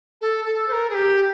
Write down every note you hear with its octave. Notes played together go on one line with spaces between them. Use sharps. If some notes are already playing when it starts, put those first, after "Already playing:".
A4
A4
C5
A#4
G#4
G4